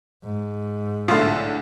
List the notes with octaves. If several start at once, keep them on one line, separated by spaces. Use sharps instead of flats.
G#2
B1 A2 D3 A3 F4